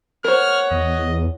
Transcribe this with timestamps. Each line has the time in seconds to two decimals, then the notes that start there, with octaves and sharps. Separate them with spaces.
0.24 A#4 C5 C#5 F#5 F6
0.71 E2 D#5